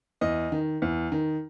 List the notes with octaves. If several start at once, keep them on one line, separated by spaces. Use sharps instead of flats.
E2 D#5
D#3
E2
D#3